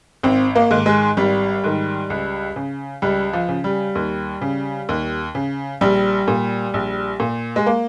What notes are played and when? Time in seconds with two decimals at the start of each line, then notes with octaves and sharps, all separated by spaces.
0.23 G#1 C4
0.55 A#3
0.71 G#2 D#3
0.86 G#3
1.17 G#1 G3
1.64 G#2 D#3
2.10 C#2
2.56 C#3
3.02 C#2 G3
3.33 F3
3.49 C#3
3.64 G3
3.95 D#2
4.41 C#3
4.89 D#2
5.35 C#3
5.81 A#1 G3
6.28 A#2
6.74 A#1
7.20 A#2
7.56 G#3
7.66 A#3